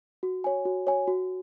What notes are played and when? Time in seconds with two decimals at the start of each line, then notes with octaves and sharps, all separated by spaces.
0.23 F#4
0.44 C#5 G#5
0.65 F#4
0.87 C#5 G#5
1.07 F#4